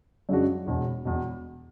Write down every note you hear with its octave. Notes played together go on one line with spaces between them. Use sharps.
F#2 C#3 G#3 D4 F#4
E1 E2 B2
E1 E2 B2